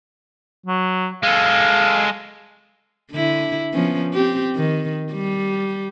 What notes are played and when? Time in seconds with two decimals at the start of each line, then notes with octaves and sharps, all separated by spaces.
0.66 F#3
1.23 G#3 A4 F5
3.12 D3 E4
3.74 F3 B3 C#4
4.13 C4 G4
4.56 D#3
5.12 G3